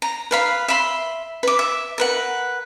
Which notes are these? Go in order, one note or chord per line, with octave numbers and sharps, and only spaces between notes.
A#5
B4 F5 B5
E5 B5 C6
B4 D6
E5
A#4 B4 F#5